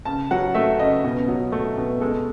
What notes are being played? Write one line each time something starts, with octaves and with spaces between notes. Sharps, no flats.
C#3 A5
F#3 F#5
A3 E5
C#3 D#5
B2
F#3
A3
B2
G#3 A4